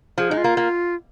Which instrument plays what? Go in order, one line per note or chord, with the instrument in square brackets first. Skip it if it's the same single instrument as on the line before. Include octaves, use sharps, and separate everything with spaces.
[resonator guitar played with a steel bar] F3 [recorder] G#4
[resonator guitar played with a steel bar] G#3 [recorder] D#4
[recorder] F4
[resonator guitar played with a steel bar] A#3
A#3